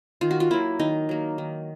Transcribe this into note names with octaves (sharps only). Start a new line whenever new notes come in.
D#3 F4
F#4
F4
F#3 A#3 E4
D#3 D#4
F#3 A#3
D#3